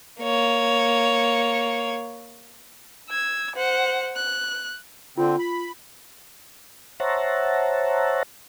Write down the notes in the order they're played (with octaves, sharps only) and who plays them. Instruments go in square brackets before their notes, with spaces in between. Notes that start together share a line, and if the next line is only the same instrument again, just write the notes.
[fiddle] A#3 C#5
[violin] E6 G#6
C5 F#5
F#6
[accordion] D3 C4 [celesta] F4
[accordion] B5
[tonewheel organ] C5 C#5 E5 F#5 A5 A#5